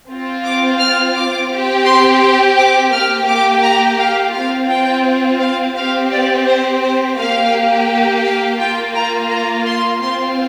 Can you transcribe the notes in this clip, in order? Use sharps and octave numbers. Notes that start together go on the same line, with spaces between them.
C4 F4
D6
F6
D6
C4 G4
C6
G5
D6
A#3 G4 F6
D6
A#5
F5
C4 F4 F5
G5
F5
C4 G4 F5
D5
C5
C5
A#3 G4 F5
F5
A#3 F4 G5
A#5
A#5
C6
C4 F4 C6